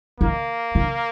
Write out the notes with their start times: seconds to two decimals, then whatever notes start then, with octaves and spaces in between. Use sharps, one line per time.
0.20 D#3 A#3
0.75 D3